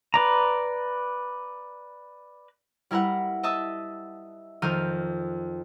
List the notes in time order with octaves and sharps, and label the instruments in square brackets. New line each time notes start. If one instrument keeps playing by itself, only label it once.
[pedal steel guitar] B4 D5 A#5
[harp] G3 E4 A#4 B4 F#5
D#5 E5 A5 D#6
F2 D#3 F3 A#4 F6 D#7